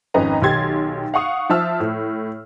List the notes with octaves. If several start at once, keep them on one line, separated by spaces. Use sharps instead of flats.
G#1 F2 C#4 B4 D#5 A#5
B1 D#3 G4 C6 G#6 A6
F5 F#5 C#6 D#6
F3 C5 E5 A5 E6 F6
A2